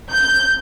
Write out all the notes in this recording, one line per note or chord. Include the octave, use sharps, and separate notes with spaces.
G6